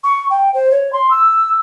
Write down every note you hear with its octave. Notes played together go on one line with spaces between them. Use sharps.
C#6
G5
C5
C#5
C6
E6